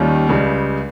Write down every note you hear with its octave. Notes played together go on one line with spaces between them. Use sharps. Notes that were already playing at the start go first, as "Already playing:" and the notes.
Already playing: D#2 D#3 G3 C#4 F4
C#2 C#3 G3